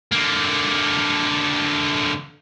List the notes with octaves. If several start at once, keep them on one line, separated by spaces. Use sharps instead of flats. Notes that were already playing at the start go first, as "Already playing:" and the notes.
D3 A#3